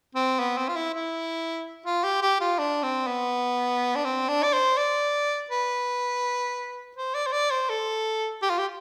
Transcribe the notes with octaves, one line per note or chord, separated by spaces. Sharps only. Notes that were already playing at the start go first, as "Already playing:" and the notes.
C4
B3
C4
F4
E4
E4
F4
G4
G4
F4
D4
C4
B3
D4
C4
D4
D5
C5
D5
B4
C5
D5
C5
D5
C5
A4
G4
F4
G4